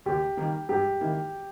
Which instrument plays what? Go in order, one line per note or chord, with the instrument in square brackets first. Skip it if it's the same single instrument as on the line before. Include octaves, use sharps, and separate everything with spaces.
[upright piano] D#2 [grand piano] G4
[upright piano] D#3 G3 A#3
[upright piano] G2 [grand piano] G4
[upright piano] D#3 A#3 E4